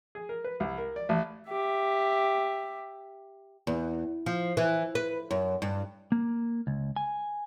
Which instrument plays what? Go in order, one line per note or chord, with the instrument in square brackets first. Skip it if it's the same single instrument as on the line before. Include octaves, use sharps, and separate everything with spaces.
[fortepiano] G#4
A#4
B4
C2
A#4
D5
A1
[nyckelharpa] G4 E5
[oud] E2
F3
E3
B4
F#2
G2
[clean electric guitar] A#3
C#2
G#5